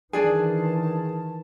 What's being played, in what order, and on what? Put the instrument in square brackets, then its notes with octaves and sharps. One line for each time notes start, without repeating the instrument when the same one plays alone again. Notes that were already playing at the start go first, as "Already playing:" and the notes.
[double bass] D#3 E3 [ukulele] D4 D5 G#5 [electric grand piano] G#4 [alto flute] A5